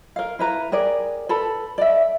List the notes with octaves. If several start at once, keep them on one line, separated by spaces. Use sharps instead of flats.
A#4 F5
E4 B4 A#5
G4 G#4 A#4 D5
A4 B4 A5 B5
D5 E5